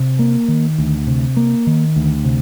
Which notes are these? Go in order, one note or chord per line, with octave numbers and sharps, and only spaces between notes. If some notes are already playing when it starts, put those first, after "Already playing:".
Already playing: C3
A#3
D#3
D2
C3
A#3
D#3
D2
C3